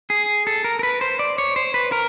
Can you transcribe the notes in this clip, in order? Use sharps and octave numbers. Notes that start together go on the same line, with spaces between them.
G#4
A4
A#4
A#4
B4
C5
D5
C#5
C5
B4
A#4